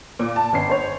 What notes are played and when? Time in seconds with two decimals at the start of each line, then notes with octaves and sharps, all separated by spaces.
0.19 A#2
0.36 A5
0.53 G1 C#4 C7
0.70 C5 C#5